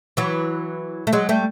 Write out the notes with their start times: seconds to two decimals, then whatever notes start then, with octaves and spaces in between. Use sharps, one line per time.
0.17 E3 F#3
1.07 A3
1.13 F#3 G#3
1.29 G3 A3